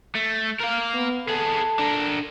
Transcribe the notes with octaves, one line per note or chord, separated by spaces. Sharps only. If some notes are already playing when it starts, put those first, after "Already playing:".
A3
A#4 F5
B3
B3 G#4 A4
D4 A#4